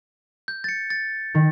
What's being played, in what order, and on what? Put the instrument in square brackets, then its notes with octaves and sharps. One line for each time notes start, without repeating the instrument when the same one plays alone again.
[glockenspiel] G6
A6 C#7
A6
[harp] D#3